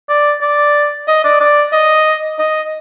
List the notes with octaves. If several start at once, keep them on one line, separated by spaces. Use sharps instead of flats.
D5
D5
D#5
D5
D5
D#5
D#5